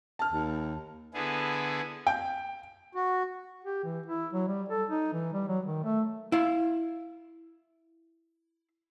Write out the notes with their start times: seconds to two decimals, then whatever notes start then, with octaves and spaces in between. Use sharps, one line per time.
0.19 A5 F6
0.32 D#2
1.14 D3 B3 E4 G#4
2.07 G5
2.95 F#4
3.65 G4
3.84 E3
4.06 E4
4.33 F#3
4.48 G3
4.69 A4
4.90 D#4
5.13 E3
5.33 G3
5.48 F#3
5.65 D#3
5.84 A3
6.32 E4 F5